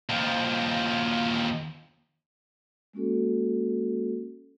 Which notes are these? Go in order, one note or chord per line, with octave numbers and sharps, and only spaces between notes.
D#2 F3
G#3 A#3 C#4 F#4 A4